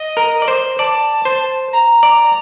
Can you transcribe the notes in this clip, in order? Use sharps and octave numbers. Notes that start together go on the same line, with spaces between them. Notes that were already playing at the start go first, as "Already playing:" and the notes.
Already playing: D#5
A#4
D5
C5
D5 A5
C5
A#5
D5